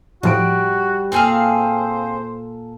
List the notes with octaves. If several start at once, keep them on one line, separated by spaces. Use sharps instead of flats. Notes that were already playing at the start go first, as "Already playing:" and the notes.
A2 F3 G3 F#4 D7
A#2 C4 G#4 A4 C5 F5